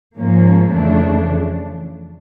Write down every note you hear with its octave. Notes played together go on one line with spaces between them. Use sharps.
G#2 F3 A#3 C#4
F2 C#3 E3 A3 D4